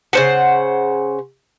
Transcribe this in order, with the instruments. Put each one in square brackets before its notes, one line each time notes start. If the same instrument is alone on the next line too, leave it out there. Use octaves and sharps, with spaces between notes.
[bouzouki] C#3 C5 F#5